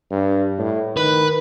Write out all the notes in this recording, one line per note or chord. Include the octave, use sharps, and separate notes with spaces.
G2
A2
D#3 B4